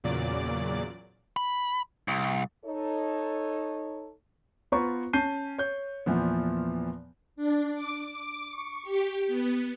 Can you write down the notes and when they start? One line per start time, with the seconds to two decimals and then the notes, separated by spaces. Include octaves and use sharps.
0.04 E2 A#2 C#3 F#3 D5 D6
1.37 B5
2.08 C2
2.65 D#4 A4 C#5
4.72 B3 F4 B4 C5 A#5 C#6
5.13 C#4 A5 G6 C7 D#7
5.58 C#5 G6
6.06 E2 A#2 E3 F3 B3
7.36 D4
7.72 D6
8.07 D6
8.48 C#6
8.83 G4
9.27 B3